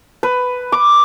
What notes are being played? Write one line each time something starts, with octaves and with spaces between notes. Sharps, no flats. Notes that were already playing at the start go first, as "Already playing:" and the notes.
B4
D6